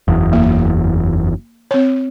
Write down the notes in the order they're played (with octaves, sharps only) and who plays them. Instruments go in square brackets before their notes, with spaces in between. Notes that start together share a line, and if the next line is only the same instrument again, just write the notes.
[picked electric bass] F#1 E2
[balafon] A#3
C4 C#5